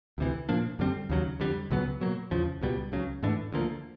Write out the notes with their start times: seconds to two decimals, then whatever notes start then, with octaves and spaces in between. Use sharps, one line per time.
0.18 D2 C3 E3
0.49 A#2 F3 A#3 D4
0.79 F#2 D3 G3 C4
1.10 D#2 C#3 F#3
1.40 F2 D3 G3
1.71 C#2 C#3 F#3 B3
2.01 B2 F#3 A#3
2.31 E2 C#3 F3
2.61 C#2 B2 G3
2.92 C#2 C#3 F#3
3.23 G#2 E3 A3 D4
3.52 D2 D3 F3 A#3